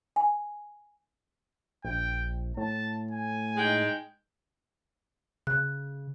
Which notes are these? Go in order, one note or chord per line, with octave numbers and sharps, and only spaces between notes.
G#5
A#1 G5
A2 A5
G#5
G#3 D#4 G5
C#3 F#6